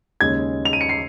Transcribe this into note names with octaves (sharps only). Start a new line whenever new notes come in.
D#2 C#3 G#3 G#6
F7
D#7
C#7
C7